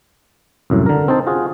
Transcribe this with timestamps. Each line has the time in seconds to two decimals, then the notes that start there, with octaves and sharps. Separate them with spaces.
0.70 C2 F#2 A2
0.86 D3 A#4
1.08 C4 D#4 C5 A5
1.27 F4 F#4 G#4